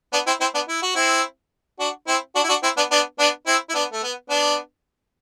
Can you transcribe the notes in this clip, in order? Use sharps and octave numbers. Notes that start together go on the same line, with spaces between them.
B3 D4
C4 E4
C4 E4
B3 D4
E4
F#4
C4 E4
D4 F#4
C4 E4
D4 F#4
E4
D4 F#4
C4 E4
B3 D4
B3 D4
B3 D4
C4 E4
E4
B3 D4
A3
B3
B3 D4